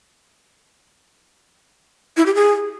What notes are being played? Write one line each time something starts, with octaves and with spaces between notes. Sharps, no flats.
E4
G4
G#4